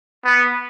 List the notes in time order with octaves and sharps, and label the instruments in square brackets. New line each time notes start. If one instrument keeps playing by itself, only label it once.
[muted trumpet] B3